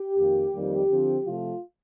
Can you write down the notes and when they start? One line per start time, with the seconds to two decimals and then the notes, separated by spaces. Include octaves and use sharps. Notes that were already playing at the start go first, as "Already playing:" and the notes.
Already playing: G4
0.18 F2 D#3 A#3
0.52 F2 D#3 G3 A#3
0.89 D3 F3 C4
1.25 C3 F3 A3 F4